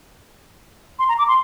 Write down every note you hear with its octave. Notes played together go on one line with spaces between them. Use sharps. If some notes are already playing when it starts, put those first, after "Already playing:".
C6
A#5
D6
C6